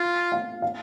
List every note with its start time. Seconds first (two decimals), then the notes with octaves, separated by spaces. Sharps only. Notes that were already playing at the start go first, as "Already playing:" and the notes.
Already playing: F4
0.32 F5
0.62 F5